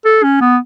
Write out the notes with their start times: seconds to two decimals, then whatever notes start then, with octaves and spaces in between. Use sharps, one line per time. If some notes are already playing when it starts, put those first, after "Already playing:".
0.05 A4
0.23 C#4
0.41 B3